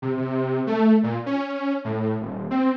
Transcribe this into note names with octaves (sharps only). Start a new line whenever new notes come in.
C3
C3
A3
A#2
C#4
A2
D#1
C4